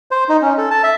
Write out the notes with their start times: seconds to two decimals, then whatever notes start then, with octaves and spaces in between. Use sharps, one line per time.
0.11 C5
0.29 D#4
0.42 C#4
0.58 A4
0.71 A5
0.84 E5